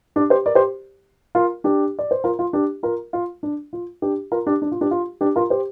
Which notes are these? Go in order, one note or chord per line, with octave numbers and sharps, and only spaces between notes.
D4 G4
G4 C5
A#4 D5
G4 C5
F4 A#4
D4 G4
D5
C5
F4 A#4
F4
D4 G4
F4 A#4
F4
D4
F4
D4 G4
F4 A#4
D4 G4
D4
F4
D4 G4
F4
D4 G4
F4 A#4
G4 C5